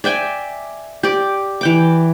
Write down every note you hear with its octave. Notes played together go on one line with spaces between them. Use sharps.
D5 E5 G5 G#5
G4 D5
E3 G5 D6